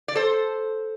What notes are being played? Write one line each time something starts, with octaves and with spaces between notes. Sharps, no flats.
D5
A4 C5